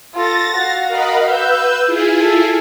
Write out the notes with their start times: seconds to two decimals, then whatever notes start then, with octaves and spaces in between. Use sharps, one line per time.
0.14 F4 A4 A6 A#6
0.53 F#4 F5
0.87 A#4 D#5 B5
1.23 B4 E6 G6
1.86 E4 F4 G#4
2.20 A4